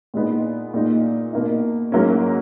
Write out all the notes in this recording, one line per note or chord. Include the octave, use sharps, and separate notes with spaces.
A#2 G#3 B3 D#4
A#2 G#3 D#4
B2 A#3 D#4
G#2 F#3 A#3 C#4